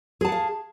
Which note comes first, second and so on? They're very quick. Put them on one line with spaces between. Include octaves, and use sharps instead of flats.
G#4 A5 F#5 F5